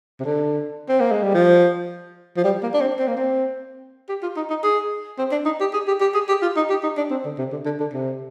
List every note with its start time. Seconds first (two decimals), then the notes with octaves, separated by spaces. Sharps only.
0.20 C3
0.24 D3
0.89 C4
1.00 A#3
1.12 G#3
1.23 G3
1.34 F3
2.37 F3
2.44 G3
2.63 A#3
2.74 D4
2.81 C4
2.99 C4
3.08 A#3
3.16 C4
4.09 G4
4.23 F4
4.36 D#4
4.50 D#4
4.63 G#4
5.18 C4
5.32 D4
5.46 D#4
5.60 G4
5.73 G#4
5.87 G4
6.01 G4
6.14 G#4
6.28 G4
6.42 F4
6.56 D#4
6.70 G4
6.83 D#4
6.97 D4
7.11 C4
7.25 D3
7.38 C3
7.52 D3
7.65 D3
7.80 D3
7.93 C3